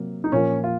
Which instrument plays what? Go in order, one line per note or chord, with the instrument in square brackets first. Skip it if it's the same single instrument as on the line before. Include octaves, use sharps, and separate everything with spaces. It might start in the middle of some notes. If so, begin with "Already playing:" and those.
Already playing: [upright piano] C3 F#3 A#3
[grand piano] D#4
[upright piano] A#2 F3 A#3 [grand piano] C#4
[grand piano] F4